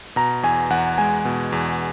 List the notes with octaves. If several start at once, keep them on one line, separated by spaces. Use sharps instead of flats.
B2 A#5
E2 G#5
E2 F#5
G#3 G#5
B2
E2